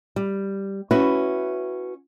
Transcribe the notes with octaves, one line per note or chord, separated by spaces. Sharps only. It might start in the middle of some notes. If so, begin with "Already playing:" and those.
G3
C#4 E4 F#4 B4